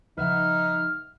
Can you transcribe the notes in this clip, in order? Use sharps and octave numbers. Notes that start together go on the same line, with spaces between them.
C#3 F3 G3 D#4 B4 E5 F#5 F6